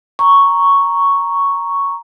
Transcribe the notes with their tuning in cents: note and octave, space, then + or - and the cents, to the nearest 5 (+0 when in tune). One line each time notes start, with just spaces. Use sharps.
A#5 +0 C#6 +0